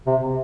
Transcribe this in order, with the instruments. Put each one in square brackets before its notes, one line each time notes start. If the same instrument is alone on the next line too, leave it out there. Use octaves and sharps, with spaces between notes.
[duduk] C3